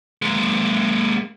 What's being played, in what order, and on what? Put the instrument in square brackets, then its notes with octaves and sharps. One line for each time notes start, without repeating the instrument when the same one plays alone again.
[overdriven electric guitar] G#3 A#3